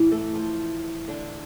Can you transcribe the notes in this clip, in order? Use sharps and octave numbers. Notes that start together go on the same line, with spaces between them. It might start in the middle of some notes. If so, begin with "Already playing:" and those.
Already playing: A2 E3
A3 A4
F3 F4
D3 D4